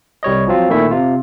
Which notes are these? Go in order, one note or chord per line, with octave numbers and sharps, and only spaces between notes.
C2 G3 C#5 D#5
F3 F#3 C4 F4
A#2 D#3 A3 E4 E5
C3 F4